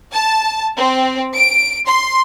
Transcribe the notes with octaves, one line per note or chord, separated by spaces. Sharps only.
A5
C4
D7
C6